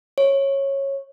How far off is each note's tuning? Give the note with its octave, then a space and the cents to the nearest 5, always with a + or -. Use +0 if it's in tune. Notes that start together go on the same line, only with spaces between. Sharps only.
C#5 -15